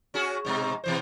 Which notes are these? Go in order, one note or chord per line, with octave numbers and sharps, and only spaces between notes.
C#4 F#4 G#4
G#2 B2 G#3
B2 E3 C5